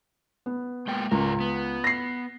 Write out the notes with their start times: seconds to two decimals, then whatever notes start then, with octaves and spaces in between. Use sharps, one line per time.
0.46 B3
0.88 G#3 A#3 G5
1.11 C#2 G#2 A#4
1.41 B3
1.84 A#6 C7